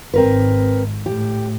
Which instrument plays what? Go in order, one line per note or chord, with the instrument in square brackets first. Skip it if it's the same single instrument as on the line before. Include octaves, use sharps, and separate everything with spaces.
[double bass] G#1 G#2 [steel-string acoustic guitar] C4 A#4 B4
[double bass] A2 [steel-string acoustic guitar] G4